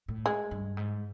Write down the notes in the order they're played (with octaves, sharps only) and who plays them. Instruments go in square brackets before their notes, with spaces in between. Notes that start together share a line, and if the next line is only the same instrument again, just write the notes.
[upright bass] A2
[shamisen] G#3
[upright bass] G2
G#2